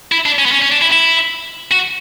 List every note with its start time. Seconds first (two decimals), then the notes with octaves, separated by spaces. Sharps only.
0.12 E4
0.26 D4
0.39 C#4
0.46 B3
0.52 C#4
0.62 C#4
0.72 D4
0.82 E4
0.92 E4
1.72 F#4